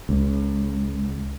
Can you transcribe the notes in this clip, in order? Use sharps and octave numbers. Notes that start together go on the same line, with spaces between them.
C#2